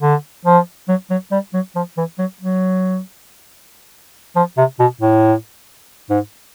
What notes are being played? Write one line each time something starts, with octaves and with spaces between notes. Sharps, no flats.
D3
F3
F#3
F#3
G3
F#3
F3
E3
F#3
F#3
F3
C3
B2
A2
G#2